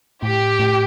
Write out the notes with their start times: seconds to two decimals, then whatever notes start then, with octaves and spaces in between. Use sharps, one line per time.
0.23 A2 G4
0.59 A2